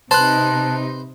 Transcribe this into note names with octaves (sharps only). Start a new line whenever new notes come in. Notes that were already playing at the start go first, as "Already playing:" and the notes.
C3 D#4 B4 C5 A5 F#6